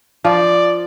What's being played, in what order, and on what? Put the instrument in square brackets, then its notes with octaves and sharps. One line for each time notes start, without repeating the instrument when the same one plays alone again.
[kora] F3 [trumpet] D5